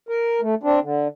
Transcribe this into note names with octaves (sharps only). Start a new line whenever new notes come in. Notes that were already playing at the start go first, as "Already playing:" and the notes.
A#4
A3
C4 D4
D3